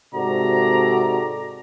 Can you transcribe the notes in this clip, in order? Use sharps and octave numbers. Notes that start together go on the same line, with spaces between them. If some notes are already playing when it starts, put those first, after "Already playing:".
G#2 C3 F#4 A4 D5 A#5